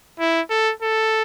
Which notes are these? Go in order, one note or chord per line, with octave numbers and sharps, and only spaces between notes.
E4
A4
A4